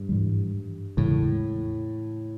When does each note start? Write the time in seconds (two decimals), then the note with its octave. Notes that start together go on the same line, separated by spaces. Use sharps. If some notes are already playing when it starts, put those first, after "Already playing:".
Already playing: G2
0.09 G#2 E3 G3
0.97 E2 A2 C#3 E3 G#3